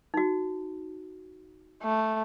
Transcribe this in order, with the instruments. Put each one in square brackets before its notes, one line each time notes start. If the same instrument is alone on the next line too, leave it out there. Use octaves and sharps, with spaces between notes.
[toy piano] D#4 F#4
[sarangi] A3